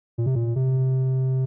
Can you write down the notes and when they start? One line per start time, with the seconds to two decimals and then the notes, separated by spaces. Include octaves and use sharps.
0.18 A#2
0.26 C3
0.35 A#2
0.56 C3